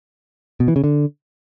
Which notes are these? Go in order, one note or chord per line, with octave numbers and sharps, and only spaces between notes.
B2
E3
C#3
D3